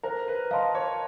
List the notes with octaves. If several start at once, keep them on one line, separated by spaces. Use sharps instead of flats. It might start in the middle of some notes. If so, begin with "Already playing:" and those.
A#4 C5
B4
D#5 F5 A5 C6
C#5